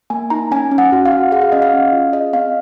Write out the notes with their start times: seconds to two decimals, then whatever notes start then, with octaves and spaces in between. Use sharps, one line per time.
0.10 A#3 G#5
0.30 D#4 A#5
0.51 C#4 G#5
0.71 C#4
0.78 F#5
0.92 F#4
1.05 F5
1.12 F#4
1.32 G#4 F#5
1.42 F5
1.52 C#4 D#5
1.62 F5
1.73 C#4
1.93 F4
2.13 G#4 D#5
2.33 C4 F5